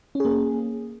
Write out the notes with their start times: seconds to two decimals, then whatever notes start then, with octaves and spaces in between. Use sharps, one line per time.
0.15 C#4
0.20 G#4
0.25 A#3